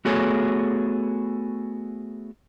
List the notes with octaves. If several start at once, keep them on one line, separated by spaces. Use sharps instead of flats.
A3 B3 F#4 G#4 A4 C#5